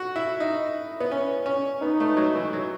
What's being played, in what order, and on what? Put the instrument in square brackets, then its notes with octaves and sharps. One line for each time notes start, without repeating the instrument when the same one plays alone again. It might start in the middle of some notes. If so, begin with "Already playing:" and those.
Already playing: [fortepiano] F#4
E4
[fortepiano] D#4 [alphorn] E4
[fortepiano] B3
C#4
C#4
[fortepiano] B3 [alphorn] D#4
[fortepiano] A3
F#3
E3
F#3